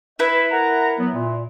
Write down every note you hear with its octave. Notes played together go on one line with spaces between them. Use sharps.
E4 B4 E5
A#4 F#5 A#5
F#3 B3
A#2